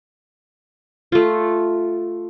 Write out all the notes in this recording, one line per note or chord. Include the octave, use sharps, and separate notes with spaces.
A3 F4